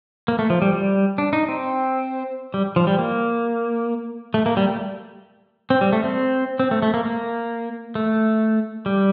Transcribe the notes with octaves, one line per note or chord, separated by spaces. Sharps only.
A#3
A3
F3
G3
G3
D4
D#4
C4
G3
F3
G3
A#3
A3
A#3
G3
A3
C4
G3
A3
C4
C4
A3
A3
A#3
A#3
A3
G3